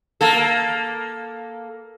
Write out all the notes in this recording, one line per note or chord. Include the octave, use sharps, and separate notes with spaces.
A#3 A4